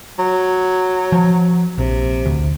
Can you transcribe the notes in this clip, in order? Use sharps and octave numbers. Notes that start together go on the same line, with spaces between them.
F#3
F3
A#1 C3
D2